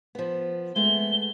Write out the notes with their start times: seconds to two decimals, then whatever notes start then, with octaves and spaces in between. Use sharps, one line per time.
0.15 F3 B3
0.76 G#3 A3 B3 G7